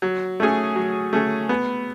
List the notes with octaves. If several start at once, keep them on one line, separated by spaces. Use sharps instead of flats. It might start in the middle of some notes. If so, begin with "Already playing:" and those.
F#3
A3 C#4 G#4
F#3
A3 C#4 G#4
B3